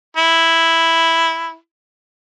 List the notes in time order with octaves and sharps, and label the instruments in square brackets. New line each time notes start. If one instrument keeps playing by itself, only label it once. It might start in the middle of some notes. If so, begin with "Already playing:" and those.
[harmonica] E4